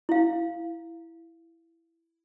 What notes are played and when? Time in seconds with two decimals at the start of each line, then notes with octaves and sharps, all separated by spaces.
0.09 E4 F5